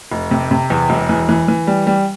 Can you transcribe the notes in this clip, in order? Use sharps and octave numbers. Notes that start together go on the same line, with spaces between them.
F1
C3
C3
E2
E1
E3
E3
E3
G3
G3